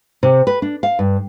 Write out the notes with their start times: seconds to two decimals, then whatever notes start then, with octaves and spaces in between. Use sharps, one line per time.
0.23 C3
0.47 B4
0.62 D4
0.83 F5
0.99 G2